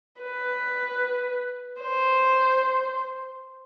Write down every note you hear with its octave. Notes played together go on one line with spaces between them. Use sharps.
B4
C5